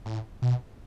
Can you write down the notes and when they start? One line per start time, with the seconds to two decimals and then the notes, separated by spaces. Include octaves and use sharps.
0.06 A2
0.42 B2